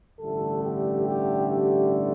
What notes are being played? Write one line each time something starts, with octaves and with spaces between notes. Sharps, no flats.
A1 G2 D3 A3 A4
G4
G4
G4